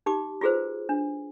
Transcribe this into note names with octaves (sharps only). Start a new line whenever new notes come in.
D#4 G4 D6
F4 F#4 G#4 B4 C5
D4